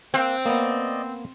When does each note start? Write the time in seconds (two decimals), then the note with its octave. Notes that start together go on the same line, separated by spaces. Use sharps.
0.14 A#3 C4 G5 F#6
0.45 A#3 B3 D5 D#5